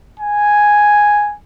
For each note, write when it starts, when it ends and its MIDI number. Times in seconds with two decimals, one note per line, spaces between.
0.20 1.34 80